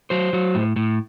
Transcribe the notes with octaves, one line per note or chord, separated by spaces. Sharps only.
F#3 C5
F#3
A2
A2